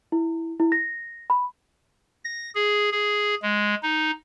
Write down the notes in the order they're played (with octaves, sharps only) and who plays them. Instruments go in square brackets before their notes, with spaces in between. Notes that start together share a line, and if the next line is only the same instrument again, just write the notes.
[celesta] E4
E4
A#6
B5
[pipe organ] A#6
G#4
G#4
G#3
D#4